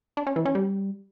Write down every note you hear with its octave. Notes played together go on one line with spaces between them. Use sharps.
D4
C#4
E3
C#4
G3